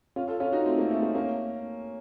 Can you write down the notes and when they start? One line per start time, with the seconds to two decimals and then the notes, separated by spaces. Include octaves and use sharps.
0.16 C#4 F4
0.28 F4 A4
0.40 C#4 F4
0.52 D#4 F#4
0.66 A3 C4
0.79 A#3
0.91 A3
1.02 A#3
1.15 A#3 C#4